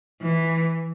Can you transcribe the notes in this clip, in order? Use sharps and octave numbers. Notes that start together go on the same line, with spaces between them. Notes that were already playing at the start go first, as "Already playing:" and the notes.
E3